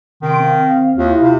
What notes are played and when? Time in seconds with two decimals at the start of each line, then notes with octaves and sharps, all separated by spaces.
0.22 C3 D#3 C6 D7
0.40 C4 F5
0.97 D#2 E4 F4 F5
1.22 C3